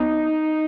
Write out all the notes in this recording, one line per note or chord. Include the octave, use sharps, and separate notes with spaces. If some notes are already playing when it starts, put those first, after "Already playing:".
Already playing: B3 D#4